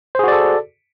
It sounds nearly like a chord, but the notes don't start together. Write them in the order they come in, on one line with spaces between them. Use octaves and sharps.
C5 G#4 F#4 D5 A4